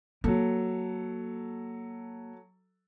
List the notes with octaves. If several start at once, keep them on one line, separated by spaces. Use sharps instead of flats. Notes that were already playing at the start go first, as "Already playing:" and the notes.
F#3 A#3 A4